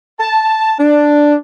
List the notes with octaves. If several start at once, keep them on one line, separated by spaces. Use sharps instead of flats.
A5
D4